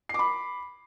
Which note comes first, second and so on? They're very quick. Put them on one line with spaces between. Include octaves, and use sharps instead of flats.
C7 D6 B5